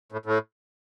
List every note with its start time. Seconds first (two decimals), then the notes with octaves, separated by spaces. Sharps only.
0.12 A2
0.26 A2